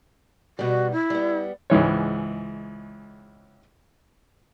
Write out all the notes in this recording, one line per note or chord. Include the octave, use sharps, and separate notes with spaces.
B2 G3 F#4
E4
G3 B3
C#2 G#2 E3 C#5